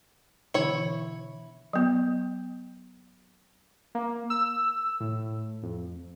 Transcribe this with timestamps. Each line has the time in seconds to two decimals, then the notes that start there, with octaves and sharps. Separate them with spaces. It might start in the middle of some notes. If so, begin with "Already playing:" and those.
0.54 B2 D3 E3 E4 C#5
1.73 F#3 B3
3.95 A#3
4.30 E6
5.00 A2
5.63 F2